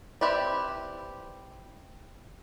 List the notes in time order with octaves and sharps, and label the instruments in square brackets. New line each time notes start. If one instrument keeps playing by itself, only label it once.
[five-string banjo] C4 E4 G4 B4 D5